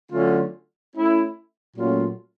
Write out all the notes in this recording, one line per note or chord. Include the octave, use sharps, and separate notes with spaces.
D3 F#3 A3 C#4 F4
A3 C#4 E4
A#2 F#3 A3 C#4 F4